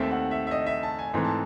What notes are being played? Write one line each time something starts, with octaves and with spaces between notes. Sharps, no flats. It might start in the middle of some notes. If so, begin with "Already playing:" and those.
Already playing: D#2 D#3 A3 C4 E5
F#5
E5
E5
D#5
E5
A5
G#5
G#2 E3 A3 C4 C6
A5